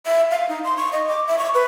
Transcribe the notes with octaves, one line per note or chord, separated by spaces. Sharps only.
E5
F5
D#4
C6
C#6
D#5
D6
E5
C#6
B4